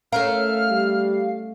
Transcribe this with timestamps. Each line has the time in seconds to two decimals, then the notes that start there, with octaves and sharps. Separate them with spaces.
0.12 A3 C#4 A#4 F5 F6
0.70 G3